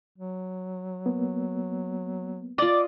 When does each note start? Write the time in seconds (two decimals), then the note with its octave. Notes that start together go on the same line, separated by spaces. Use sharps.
0.18 F#3
1.06 A#3 B3
2.58 F4 D5 D#5